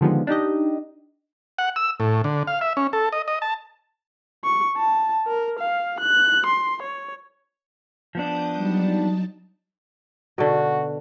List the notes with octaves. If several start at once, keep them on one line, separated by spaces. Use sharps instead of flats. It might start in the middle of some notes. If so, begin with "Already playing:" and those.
D3 D#3 F3 G3 G#3 B3
D4 D#4 G4 D#5
F#5
E6
A2
D3
F5
E5
C#4
A4
D#5
D#5
A5
C#6
A5
A#4
F5
F#6
C6
C#5
F3 B3 D4 D6 D#6 G6
F#3 G3 D#4 A5
B2 D3 F#4